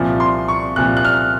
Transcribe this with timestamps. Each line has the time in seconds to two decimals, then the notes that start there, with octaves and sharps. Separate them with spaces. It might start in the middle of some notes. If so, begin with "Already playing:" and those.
Already playing: C2 A#2 F3
0.20 C6
0.48 C#6
0.76 C2 A#2 F3 F#6
0.97 F#6
1.05 F6